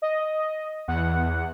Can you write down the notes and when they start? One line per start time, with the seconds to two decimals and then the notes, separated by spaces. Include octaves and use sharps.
0.02 D#5
0.88 E2 F#5